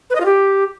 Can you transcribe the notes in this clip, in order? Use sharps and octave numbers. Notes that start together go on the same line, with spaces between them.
B4
D#5
F4
G4